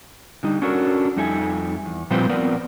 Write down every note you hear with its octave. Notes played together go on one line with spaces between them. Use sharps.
D3 G3 D#4
C#4 D4 F#4 A4 A#4
F2 G3 D#4 A4 E5 G#5
E2
A#2 F3 G3 C4 B4 C5
F3 B3 C4 A#4 B4 D5